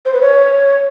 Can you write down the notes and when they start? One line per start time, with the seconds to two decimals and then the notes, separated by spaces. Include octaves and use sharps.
0.05 C5
0.13 B4
0.21 C#5